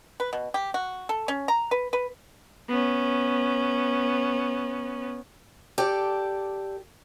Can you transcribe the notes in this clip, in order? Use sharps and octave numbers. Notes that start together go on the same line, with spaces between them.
B4
B2
G4
F#4
A4
C#4
A#5
B4
B4
B3 C#4
G4 A4 D5